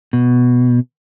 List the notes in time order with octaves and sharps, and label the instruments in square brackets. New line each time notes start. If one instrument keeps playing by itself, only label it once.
[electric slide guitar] B2